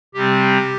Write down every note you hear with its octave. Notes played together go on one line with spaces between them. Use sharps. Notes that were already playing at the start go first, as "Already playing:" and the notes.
C3 G3 C4 G4